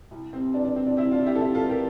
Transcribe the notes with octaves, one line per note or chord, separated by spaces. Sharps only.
C2
C3 C4
E3 D4
D4
C2 C4
D4
C3 C4 E4
D4 F4
C2
E4 G4
A4
C3 E4 G4
F4 A4
E3
G4 A#4